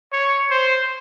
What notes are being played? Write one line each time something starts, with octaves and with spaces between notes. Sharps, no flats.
C#5
C5